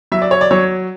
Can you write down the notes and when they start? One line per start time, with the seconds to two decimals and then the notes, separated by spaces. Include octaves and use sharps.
0.12 F#3 E5
0.22 D5
0.31 C#5
0.41 D5
0.51 F#3 C#5